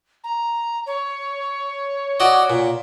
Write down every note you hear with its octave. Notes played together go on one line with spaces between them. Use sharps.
A#5
C#5
F#4 D5 D#5
A#2